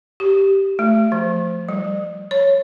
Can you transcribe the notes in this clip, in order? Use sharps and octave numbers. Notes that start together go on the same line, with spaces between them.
G4
A3
F3
G3
C#5